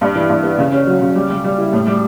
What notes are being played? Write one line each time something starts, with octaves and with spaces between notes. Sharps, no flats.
G2
E3
G2
B3
C#3
C#4
F#3
C#3
G3
G3
G3
E4
A2
G3